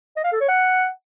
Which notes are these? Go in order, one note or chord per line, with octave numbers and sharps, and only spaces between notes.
D#5
F5
A4
C#5
F#5